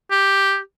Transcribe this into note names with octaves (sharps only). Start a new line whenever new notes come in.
G4